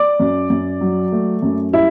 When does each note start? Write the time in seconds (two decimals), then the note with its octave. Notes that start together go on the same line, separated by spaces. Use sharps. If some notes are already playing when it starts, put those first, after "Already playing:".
Already playing: D5 D6
0.20 F#2
0.50 F#2
0.81 F#3
1.12 A3
1.42 F#2
1.72 G3 E4 E5